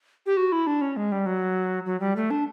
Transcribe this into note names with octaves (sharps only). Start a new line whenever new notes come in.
G4
F#4
E4
D4
C#4
G#3
G3
F#3
F#3
G3
A3
D4